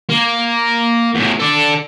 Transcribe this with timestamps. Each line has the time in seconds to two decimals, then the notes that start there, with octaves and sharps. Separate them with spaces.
0.09 A#3
1.15 E2 A2
1.40 A4 D5